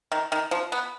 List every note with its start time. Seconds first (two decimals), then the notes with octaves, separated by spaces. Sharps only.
0.12 D#3
0.32 D#3
0.51 F3
0.72 B3